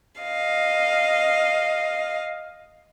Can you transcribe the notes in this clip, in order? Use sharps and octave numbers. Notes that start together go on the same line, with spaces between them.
D#5 F5